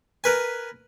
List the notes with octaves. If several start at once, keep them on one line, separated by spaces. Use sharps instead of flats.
A#4 B4 G#5